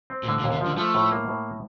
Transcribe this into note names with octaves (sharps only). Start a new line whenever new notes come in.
C4
A#2
A2 D3
A#2
D#2
C3
D3 F3
F3 A3
A2
A#3
A2